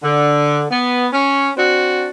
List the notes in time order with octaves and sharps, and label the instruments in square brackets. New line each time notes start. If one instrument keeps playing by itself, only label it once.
[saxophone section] D3
B3
C#4
C4 D4 F#4